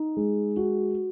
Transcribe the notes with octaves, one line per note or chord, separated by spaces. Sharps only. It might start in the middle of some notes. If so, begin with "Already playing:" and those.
Already playing: D#4
G#3
F#4